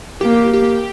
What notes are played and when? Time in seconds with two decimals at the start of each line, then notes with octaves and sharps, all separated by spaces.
0.21 A#3 G4
0.53 G4